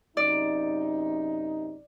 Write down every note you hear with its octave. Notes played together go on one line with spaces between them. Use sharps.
F#2 C3 D#4 D5